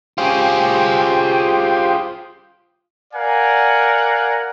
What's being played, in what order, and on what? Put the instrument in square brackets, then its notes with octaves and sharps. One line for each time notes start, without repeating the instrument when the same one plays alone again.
[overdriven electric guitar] F4 G#4 [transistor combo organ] G4 C5
[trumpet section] A#4 D5 F5 F#5 G#5